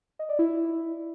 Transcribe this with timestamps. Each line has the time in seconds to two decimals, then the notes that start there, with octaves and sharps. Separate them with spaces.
0.19 D#5
0.29 D5
0.39 E4